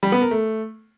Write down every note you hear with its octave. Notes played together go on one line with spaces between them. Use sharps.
G3
B3
A#4
A3